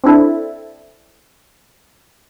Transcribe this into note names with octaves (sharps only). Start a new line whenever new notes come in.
C4 D4 E4 A4